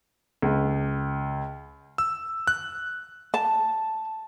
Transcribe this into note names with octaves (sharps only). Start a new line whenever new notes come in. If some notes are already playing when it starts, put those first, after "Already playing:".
C#2
E6
F#6
A5